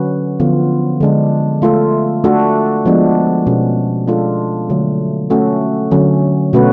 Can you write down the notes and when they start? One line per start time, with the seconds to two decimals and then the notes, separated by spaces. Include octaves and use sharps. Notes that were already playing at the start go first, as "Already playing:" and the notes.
Already playing: D3 F#3 C#4 F#4 B4
0.40 D3 F3 B3 F4
1.01 D3 G#3 D4
1.62 A3 F4 A4
2.24 A3 D4 F#4 A4
2.86 F3 G#3 B3 D4
3.47 B2 G#3 C#4
4.08 G#3 D4 F4 A4
4.70 D3 F#3 A3
5.30 A3 C#4 F#4 A4
5.91 D3 F#3 C#4
6.53 B2 A3 C#4 F#4 B4